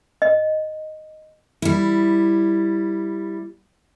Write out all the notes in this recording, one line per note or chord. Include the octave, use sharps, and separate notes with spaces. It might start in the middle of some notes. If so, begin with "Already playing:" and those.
D#5
G3 E4